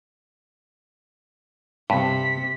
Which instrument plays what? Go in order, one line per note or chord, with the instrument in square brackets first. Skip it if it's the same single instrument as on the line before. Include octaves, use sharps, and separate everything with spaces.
[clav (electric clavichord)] G2 [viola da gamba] C3 [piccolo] B6